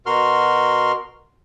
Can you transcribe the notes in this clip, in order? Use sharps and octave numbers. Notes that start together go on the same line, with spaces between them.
B2 F#4 A#4 C6 F6